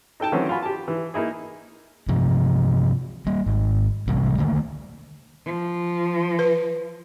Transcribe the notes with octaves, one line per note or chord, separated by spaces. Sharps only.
D#4 A4 G5 A5
D#3 E3 F#3 A3 C4 C#4
F4 F#4 G#5 B5
G4 G#5 A5
E3
A#3 D#4 E4 G#4
G2 C3 F3
G3 A#3
G#1
A1 C3 G3
D3 D#3 A3 A#3
F3
B4